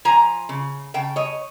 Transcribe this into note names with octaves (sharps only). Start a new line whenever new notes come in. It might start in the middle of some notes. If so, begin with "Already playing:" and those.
F3 G#5 A#5
C#3
C#3 G5 A5
C#5 D#5